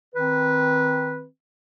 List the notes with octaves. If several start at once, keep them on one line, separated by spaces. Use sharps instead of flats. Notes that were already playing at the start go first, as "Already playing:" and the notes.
D#3 C4 B4